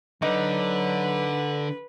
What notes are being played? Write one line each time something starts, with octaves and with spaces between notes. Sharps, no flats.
D3 F#3 D#4 B4 D6